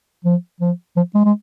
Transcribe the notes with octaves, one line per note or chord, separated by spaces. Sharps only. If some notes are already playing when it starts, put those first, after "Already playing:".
F3
F3
F3
G#3
G#3